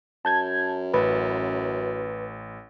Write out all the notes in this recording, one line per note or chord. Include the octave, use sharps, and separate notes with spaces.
F#2 A5 G6 G#6
A1 B4